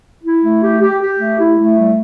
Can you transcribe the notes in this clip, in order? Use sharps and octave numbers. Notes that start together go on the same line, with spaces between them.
E4
A3
G4
G4
G4
A3
E4
A3
G3